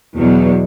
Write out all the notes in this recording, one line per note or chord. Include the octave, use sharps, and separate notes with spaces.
E2 B2 F#3